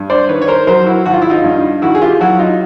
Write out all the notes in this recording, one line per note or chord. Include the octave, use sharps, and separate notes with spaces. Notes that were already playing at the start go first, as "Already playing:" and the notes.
Already playing: G2
C5 D5
D#3 B4 C#5
C#5
A#4 C5
F#3 A#4 C5
E4 F#4
G#1 F#4
F4
E4
D#4 F4
G2
D#3 E4 F#4
G#4
F4 G4
F#3 E4 F#4
D#4 F4